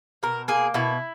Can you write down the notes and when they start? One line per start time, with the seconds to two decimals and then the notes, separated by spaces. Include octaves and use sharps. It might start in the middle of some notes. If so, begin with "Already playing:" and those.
0.23 B2 A#4
0.48 A#3 G#4
0.74 B2 E4